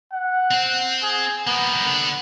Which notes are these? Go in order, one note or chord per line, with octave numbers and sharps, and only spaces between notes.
F#5
C4 C5
G#4
G3 A#3 B3
D3 D5